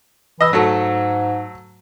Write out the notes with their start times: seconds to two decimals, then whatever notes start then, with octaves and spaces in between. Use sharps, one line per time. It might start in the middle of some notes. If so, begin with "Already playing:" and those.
0.41 E3 D#5 E6
0.53 G#2 F#3 A3 A4